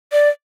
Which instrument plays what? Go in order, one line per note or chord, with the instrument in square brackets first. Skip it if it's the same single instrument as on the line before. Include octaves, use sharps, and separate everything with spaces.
[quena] D5